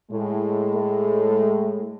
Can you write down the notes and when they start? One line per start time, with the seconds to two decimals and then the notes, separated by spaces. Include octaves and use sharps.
0.11 A2 G#3
0.74 A3